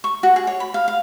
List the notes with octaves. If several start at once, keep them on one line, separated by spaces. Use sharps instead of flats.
C#6
F#4
G#4
C#5
B5
F5
F5